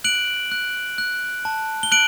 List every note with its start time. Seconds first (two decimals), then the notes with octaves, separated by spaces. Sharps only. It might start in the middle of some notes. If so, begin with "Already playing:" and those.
0.04 F#6 D7 F#7
0.52 F#6
0.98 F#6
1.45 A5
1.83 G7
1.92 F#6 D7 F#7